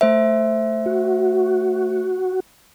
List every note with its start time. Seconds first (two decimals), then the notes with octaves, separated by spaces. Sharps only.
0.01 A3 C5 E5
0.86 F#4